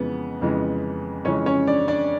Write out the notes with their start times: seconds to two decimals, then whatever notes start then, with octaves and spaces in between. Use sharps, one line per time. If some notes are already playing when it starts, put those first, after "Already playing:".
Already playing: F2 C#3 E3 G#3 B3 B4
0.41 F2 C#3 E3 G#3
1.25 F2 C#3 E3 G#3 C#4 C#5
1.46 C#4 C#5
1.67 D4 D5
1.88 D4 D5